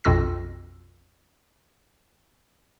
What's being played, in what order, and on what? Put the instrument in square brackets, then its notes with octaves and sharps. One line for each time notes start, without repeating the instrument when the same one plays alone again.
[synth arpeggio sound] A#1 F2 B2 F4 E6 A#6